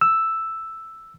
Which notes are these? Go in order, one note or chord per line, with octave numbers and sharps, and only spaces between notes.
E6